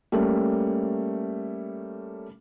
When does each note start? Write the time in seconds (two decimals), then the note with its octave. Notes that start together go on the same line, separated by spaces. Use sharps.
0.12 G3 A3 A#3 C#4